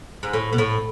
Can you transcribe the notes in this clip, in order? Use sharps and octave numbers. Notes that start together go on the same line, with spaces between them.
G#2
A2
B2
A2